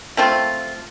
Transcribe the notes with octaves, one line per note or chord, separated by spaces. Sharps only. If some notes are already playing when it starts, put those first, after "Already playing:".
A3 C4 F4